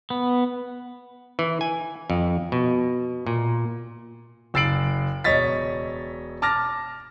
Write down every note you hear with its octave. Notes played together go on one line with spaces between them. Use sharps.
B3
E3
G#5
F2
B2
A#2
F#1 E6 A6 C7 D7 F#7
E1 C#5 D#5 A6 B6
A5 D6 F6 A6 A#6